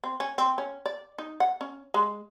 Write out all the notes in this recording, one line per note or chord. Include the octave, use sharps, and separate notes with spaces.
C4
C#4
C4
C#4
D5
D#4
F#5
C#4
G#3